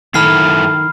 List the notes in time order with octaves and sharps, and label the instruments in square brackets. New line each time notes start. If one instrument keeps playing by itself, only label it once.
[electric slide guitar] F#2 E4 A4 [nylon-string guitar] D#3 [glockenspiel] B5 F6 C7